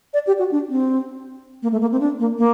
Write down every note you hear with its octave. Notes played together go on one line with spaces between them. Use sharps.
D5
G4
F#4
D4
C4
A#3
A3
A#3
C4
D4
A#3
A#3